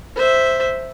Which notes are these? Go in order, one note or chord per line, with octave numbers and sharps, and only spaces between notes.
C5 E5